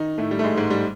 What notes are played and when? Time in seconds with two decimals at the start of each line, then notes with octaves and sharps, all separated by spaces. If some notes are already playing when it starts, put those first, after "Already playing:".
Already playing: D#3 D#4
0.18 A2 A3
0.31 G3
0.39 A3
0.44 G#2 G#3
0.57 G#2 G#3
0.70 G3